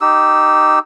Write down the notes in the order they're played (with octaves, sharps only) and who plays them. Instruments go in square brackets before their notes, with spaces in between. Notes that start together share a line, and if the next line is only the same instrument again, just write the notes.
[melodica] D#4 G4 E6